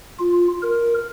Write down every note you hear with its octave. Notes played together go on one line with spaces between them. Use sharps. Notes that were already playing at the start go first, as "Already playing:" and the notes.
F4
A#4